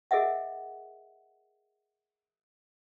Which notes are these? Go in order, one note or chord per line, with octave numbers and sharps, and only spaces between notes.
G#4 A#4 D#5 E5 F#5